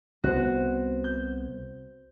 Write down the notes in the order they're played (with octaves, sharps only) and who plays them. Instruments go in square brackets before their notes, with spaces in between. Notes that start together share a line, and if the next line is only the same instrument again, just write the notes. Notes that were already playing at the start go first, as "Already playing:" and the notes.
[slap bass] C2 B3 [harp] F#4 C5
[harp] G6